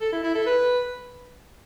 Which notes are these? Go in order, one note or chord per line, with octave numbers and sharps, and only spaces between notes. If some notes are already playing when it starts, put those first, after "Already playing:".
A4
E4
E4
A4
B4